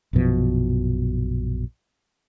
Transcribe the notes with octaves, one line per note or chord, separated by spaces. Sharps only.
A#1 F#2 B2 F3